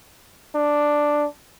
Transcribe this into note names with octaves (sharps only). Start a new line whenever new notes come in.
D4